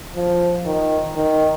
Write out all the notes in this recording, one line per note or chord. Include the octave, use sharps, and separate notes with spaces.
F3
D#3
D#3